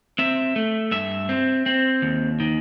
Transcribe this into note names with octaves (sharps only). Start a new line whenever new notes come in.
C4 E5
A3
G2 E5
C4
C4
D#2
D#3